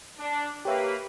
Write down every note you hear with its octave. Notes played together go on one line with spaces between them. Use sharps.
D4
A#3 G4 B4 C#5 E5